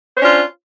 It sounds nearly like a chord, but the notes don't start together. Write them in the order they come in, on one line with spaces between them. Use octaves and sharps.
C5 C#5 D4 C#4 F4